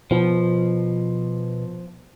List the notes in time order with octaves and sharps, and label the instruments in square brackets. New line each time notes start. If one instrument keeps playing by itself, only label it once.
[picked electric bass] B2 [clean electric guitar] F3